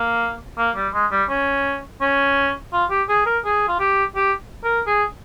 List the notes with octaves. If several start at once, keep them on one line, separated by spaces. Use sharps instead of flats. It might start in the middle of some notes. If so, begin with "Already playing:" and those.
Already playing: A#3
A#3
G3
G#3
G3
C#4
C#4
F4
G4
G#4
A#4
G#4
F4
G4
G4
A#4
G#4